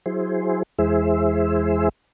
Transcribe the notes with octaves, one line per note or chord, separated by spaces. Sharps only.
F#3 E4 G#4 C5
E2 G#3 E4 G#4 C5 E5